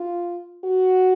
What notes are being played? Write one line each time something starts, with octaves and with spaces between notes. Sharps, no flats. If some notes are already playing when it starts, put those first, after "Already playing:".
Already playing: F4
F#4